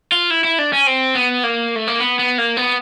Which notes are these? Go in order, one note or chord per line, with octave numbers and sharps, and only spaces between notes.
F4
E4
E4
D4
C#4
C4
B3
A#3
A3
A#3
B3
B3
A#3
B3